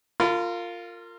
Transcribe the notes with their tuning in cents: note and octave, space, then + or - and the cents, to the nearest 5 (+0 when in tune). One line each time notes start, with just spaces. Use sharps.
F4 +0 A#4 -30 B5 +40